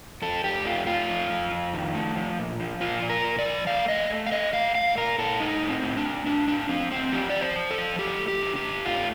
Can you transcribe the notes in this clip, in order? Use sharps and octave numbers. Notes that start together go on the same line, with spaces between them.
F2 A4
F2 G4
A3 F4
A3 F4
F2
F2
F2
D#3
A3
F3
A#2
F3
A#2 F4
A#2
A#4
A#2
D5
F3
A3 F5
A3 D#5
A3
F5
A3 D#5
A3 F5
A3 F5
A#2 A#4
A#2 A4
A2 D#4
A2
C4
A2
D4
A3
A2 D4
A2 D4
F3 C4
A2 C4
F3 G4
D5
F3
C5
F3
A4
F3
A3 G4
A3
G4
D3
G4
G2
A3 F4